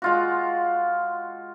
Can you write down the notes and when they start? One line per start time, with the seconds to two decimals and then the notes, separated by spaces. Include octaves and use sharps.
0.02 G#3 F4 F#4